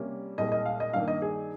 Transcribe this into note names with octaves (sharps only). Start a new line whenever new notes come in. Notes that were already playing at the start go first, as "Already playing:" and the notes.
Already playing: C3 G3 A#3 C#4
C2 A#2 G#3 D#5
D#5
F5
D#5
G2 D#3 A#3 F5
D#5
G#4